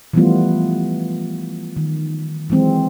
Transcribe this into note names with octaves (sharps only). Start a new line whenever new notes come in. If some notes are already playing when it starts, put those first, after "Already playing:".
E3 F3 G3 A3 B3 F4
D#3
E3 F#3 G#3 C4